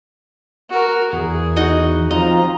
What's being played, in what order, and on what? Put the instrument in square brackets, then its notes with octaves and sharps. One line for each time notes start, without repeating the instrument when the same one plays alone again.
[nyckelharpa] F#4 A#4
[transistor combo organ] E2 [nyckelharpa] G#4
[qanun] D#4 F#4 D#5
[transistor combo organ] F3 C4 F4 [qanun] D#5 [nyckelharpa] A#5